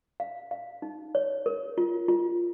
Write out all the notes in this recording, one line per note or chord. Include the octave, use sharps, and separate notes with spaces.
F5
F5
D#4
C#5
A#4
F4
F4